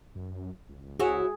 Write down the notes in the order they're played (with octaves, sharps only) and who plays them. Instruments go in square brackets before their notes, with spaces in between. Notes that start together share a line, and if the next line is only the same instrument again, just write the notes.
[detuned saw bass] F#2
C#2
[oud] E4 F#4 C#5 [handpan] G#4